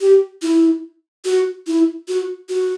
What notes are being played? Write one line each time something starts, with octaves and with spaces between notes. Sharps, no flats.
G4
E4
F#4
E4
F#4
F#4